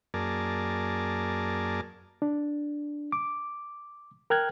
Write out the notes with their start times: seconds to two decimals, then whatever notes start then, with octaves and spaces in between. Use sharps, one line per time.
0.14 F#2 A#3 G#4 A#4 D5 A5
2.22 D4
3.12 D6
4.30 A#4 G5 F6 F#6 G#6